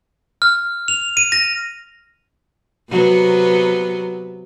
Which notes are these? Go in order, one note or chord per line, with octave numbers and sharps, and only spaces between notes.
F6
F7
D#7
A#6
C3 F#3 B3